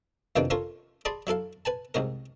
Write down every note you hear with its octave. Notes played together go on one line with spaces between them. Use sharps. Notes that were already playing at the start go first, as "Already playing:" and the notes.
F2 C3 D#3 E3 A#3 D4
C#4 F4 A4 A#4 C#5 C6
G#4 D5 A5 B5 C6
F#3 E4 A4 F5
B4 G#5 A5
C2 G#2 C#4 A#4